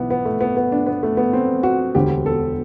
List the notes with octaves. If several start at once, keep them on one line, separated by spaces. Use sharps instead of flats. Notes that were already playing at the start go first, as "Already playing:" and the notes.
Already playing: B1 E3 B3
B3
A3
B3
B3
D4
B3
A3
B3
C4
F#4
E1 D2 D3 G4
A4